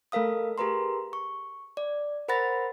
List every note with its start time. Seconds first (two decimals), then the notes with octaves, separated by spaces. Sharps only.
0.12 A3 A4 A#4 F5 D#6
0.58 G4 G#4 A#4 B4 A#5 C6
1.13 C#6
1.77 D5
2.28 A#4 C5 F#5 B5 A6 A#6